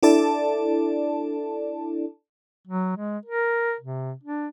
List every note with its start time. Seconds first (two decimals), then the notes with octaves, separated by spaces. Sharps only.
0.03 D4 E4 A4 D5 A5
2.68 F#3
2.97 G#3
3.26 A#4
3.80 C3
4.23 D4